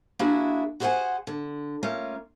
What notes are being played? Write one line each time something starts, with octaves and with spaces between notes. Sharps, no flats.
A#3 D4 E4 F#4 G#4 E5
F#4 G#4 C5 C#5 F#5 G#5
D3
A3 A#3 C#4 F4